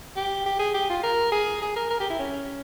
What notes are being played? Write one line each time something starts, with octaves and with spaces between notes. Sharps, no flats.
G4
G4
G#4
G4
F4
A#4
G#4
G#4
A#4
A#4
G4
E4
C#4